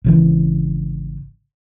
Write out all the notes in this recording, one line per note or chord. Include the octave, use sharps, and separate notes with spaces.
G#1 C#3 E3